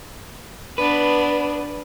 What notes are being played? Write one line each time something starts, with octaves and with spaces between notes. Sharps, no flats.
B3 D4 B4